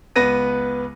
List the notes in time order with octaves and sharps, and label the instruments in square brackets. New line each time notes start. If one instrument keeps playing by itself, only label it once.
[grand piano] C#2 B3 B4 A#6 D#7